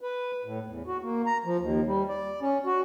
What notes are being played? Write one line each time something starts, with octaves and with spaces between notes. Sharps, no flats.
B4
A2
E2
F#4
A#3
A#5
F3
D#2
G3
D5
C#4
F#4